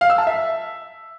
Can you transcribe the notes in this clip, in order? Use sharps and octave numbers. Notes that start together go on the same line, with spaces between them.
F5
E6
A5
E5